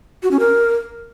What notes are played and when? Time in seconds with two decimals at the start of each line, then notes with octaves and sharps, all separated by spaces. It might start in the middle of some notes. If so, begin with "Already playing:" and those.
0.23 F#4
0.31 C#4
0.40 A#4